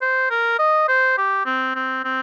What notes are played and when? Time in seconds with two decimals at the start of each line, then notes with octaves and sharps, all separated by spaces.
0.01 C5
0.30 A#4
0.59 D#5
0.88 C5
1.17 G4
1.46 C4
1.75 C4
2.05 C4